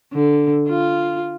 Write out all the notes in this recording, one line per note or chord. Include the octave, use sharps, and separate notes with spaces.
D3
F4